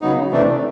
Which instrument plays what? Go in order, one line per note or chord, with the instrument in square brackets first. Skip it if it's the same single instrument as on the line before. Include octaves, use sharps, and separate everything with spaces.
[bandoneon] C#3 F#3 B3 D#4
C3 E3 A3 D4